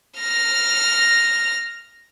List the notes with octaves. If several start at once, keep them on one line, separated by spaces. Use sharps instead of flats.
F6 A#6